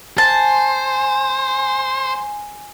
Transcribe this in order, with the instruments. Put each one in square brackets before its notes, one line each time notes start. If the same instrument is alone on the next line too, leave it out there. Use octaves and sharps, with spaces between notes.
[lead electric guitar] C5 [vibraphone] G#5 [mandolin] A5